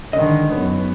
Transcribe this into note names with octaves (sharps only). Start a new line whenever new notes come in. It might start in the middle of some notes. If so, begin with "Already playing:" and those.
G#2 D3 D#3 D#5
F#2 B3